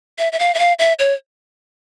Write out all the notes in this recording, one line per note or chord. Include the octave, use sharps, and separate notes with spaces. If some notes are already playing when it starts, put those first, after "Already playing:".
E5
E5
F5
E5
F5
E5
C#5